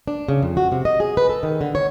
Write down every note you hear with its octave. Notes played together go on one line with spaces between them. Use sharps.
D4
C#3
F2
F#4
C3
D#5
G#4
B4
A4
D#3
D3
C#5